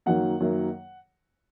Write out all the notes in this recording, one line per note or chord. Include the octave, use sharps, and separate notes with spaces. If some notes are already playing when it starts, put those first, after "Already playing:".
F#2 D#3 F#3 A#3 F#5
F#2 D#3 F#3 A#3